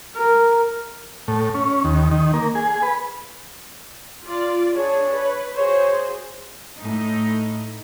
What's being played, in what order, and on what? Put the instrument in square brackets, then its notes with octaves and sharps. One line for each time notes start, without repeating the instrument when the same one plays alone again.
[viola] A#4
[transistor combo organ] A2
C#4
D#2
D#3
A#3
G#4
B4
[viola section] F4 D5
[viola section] D4 G#4 [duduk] C#5
[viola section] B4
[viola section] F#4 G#4 C5 [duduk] C#5
[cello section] A2 D#4